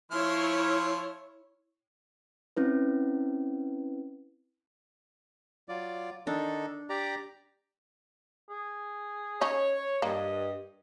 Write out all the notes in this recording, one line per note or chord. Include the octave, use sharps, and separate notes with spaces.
F3 E4 C#5 C6 F6
C4 C#4 E4 B4
F#3 F4 D5
D#3 D4 D#4 A4
G4 D5 A#5
G#4
C#4 D#4 C#5
G2 A#3 D#5